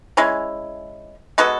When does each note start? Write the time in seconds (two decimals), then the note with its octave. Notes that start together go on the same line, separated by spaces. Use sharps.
0.17 G#3 C#4 E4
1.38 G#3 B3 F#4 A4